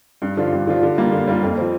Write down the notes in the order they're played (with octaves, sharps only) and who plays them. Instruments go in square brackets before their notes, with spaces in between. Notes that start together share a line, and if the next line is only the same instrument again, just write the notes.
[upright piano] G2
D3 F3 D4 F4
G2
D3 F3 D4 F4
D3
G3 A#3 F4
D3
G3 A#3 F4
F2
F3 C4